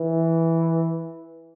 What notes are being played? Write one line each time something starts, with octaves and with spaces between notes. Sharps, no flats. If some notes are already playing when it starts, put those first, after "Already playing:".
Already playing: E3